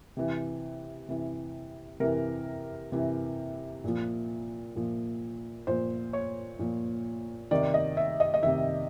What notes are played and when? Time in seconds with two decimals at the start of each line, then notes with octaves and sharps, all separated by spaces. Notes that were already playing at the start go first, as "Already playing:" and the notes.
0.17 C3 E3
1.09 C3 E3
2.00 C3 E3 A#4
2.92 C3 E3
3.84 A#2 F3
4.76 A#2 F3
5.67 A#2 F3 C5
6.13 C#5
6.59 A#2 F3
7.51 C3 D#3 D5
7.74 D#5
7.97 E5
8.20 D#5
8.34 D#5
8.43 C3 D#3 E5